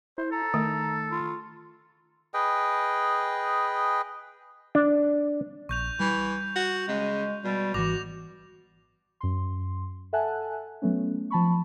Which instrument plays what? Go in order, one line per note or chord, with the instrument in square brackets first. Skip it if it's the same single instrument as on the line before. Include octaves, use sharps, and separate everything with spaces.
[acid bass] E4 [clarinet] C5
[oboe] A4 [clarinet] A#5
[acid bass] D#3 [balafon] A3
[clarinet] F4
[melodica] G#4 B4 D#5 G5
[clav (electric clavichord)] D4
[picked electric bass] A#1 [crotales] C#6 G6 F7
[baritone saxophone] E3 [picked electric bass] G3
[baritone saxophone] F#4
[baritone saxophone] C#3 [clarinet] G#3
[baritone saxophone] B2 [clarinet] G3
[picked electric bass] G#1 E3 [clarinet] F#4 [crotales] D6 A#6 F7
[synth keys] F#2 C6
A4 E5 F#5 G#5 A5 F#6
F#3 A3 B3 C#4
F3 A5 B5 C#6